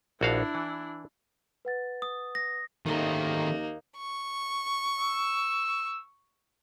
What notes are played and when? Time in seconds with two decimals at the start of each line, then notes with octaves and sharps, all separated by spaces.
0.21 A#1 D4 E4 F#4 F5
0.55 E3
1.65 B4 F#5 A6
2.02 D#6
2.35 A#6
2.86 D#2 D3 D#3 A3 A#3 C4 C#4 D#4
3.97 C#6
5.00 E6